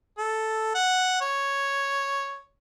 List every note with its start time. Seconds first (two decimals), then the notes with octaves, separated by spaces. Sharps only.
0.18 A4
0.74 F#5
1.21 C#5